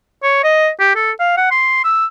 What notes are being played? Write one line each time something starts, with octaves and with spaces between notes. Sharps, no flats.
C#5
D#5
G4
A4
F5
F#5
C6
E6